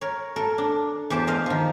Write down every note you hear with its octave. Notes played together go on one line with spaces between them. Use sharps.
A#4 C#5
A4 A#4
D4
E2 G4 C5 A5
C5 D#5 F5
D#3 F3